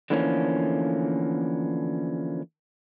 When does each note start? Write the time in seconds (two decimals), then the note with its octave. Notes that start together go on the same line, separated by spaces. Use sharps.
0.10 D3 E3 F3 A3 A#3 C#4